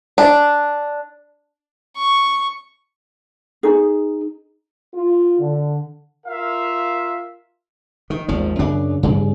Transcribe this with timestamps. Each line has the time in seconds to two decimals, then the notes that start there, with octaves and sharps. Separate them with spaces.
0.18 D4
1.96 C#6
3.63 D#4 G#4
4.94 F4
5.40 D3
6.26 F4 A#4 E5 F5
8.10 D#3
8.28 G#1 D#2 F3
8.59 F#2 C#3 D4
9.03 G2 C#3